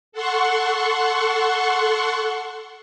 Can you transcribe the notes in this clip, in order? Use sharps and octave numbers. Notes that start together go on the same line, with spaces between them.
A4 F#5 C6 C#6